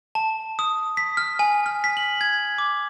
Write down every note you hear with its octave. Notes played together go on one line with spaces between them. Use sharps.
A5
D#6
B6
F6
G#5
F6
B6
F#7
G#6
D6